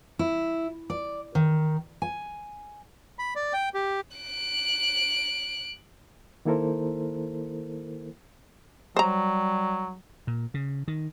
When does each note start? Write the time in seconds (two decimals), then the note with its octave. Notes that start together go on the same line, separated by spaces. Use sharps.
0.19 E4
0.90 D5
1.35 D#3
2.02 G#5
3.19 B5
3.36 D5
3.53 G5
3.74 G4
4.17 F#6 D7
6.45 D#3 A#3 E4 A4 A#4 C5
8.96 F#3 G3 C5 A#5
10.27 A#2
10.54 C#3
10.88 D#3